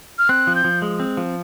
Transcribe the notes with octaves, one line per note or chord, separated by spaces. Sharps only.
F6
C4 F#6
F3
G6
F3
G#3
C4
F3